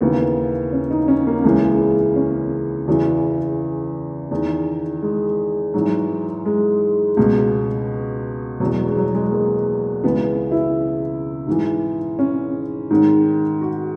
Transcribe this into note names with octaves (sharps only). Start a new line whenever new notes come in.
D#2 C#3 E3 B3
C#4
D#4
C#4
A#3
C#2 C#3 E3 A#3
G#3
C#4
E2 C#3 E3
E2 D#3
G#3
G#2 E3 F#3
G#3
C#2 B2
E2 B2 F#3
G#3
F#3
G#3
A#3
C#2 C#3 E3 B3
E4
G#2 E3
C#4
G#2 D#3
F#4